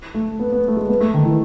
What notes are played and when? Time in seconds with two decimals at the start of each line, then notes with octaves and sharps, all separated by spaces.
0.15 A3
0.39 B3
0.52 B3
0.68 A3
0.77 G#3
0.89 B3
1.01 A3
1.14 D#3
1.25 E3